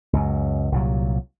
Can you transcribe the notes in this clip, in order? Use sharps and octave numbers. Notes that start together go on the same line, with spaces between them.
C#2 F#2
C2 A#2 F#3